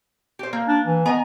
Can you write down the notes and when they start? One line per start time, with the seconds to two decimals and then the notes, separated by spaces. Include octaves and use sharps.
0.39 G4 C5
0.53 A#3
0.68 D4
0.87 E3
1.06 B3 D#5 G#5 A#5